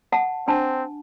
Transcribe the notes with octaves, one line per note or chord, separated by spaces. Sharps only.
F#5 A5
C4 D4 A5